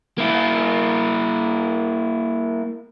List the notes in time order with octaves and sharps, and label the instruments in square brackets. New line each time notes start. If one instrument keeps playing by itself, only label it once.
[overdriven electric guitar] A#3 E4